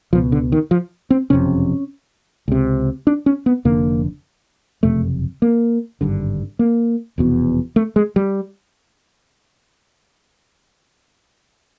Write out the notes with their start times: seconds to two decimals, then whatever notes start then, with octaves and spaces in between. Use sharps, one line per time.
0.13 C#2 B2 F3
0.32 D3
0.52 D#3
0.71 F3
1.10 C4
1.30 F#1 F2 C3 C#4
2.48 C#2 C3
3.07 D4
3.26 C#4
3.46 B3
3.65 F1 F2 D3 A#3
4.83 F#1 F2 C3 A3
5.42 A#3
6.01 G#1 G2 D3
6.59 A#3
7.18 F1 E2 B2
7.76 A3
7.96 G#3
8.16 G3